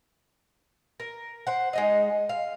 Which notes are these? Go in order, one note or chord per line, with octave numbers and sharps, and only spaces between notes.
A#4
C5 F#5
G#3 D#4 D#5
F5